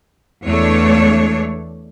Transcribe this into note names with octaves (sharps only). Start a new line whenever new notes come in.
E2 A3 D4 C#5